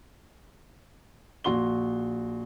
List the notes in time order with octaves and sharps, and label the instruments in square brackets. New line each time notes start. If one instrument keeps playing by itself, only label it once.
[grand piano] A#1 F#4 C6 G7